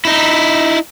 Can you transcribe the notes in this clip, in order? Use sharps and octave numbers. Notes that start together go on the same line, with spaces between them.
D#4 E4